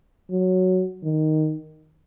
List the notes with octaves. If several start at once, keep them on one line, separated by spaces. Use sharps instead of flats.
F#3
D#3